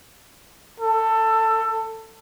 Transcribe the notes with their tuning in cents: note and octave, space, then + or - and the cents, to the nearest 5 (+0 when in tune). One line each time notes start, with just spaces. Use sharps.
A4 +15